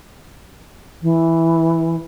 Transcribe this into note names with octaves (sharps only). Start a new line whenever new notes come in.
E3